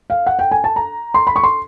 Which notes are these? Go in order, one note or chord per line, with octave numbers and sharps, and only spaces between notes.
F5
F#5
G5
G#5
A5
A#5
C6
B5
C#6
C6